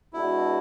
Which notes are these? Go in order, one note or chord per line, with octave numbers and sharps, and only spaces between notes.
B2 G#3 D4 E4 F#4